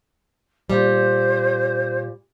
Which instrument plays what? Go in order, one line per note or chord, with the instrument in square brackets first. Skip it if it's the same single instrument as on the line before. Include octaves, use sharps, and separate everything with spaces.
[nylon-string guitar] A#2 G3 [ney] C5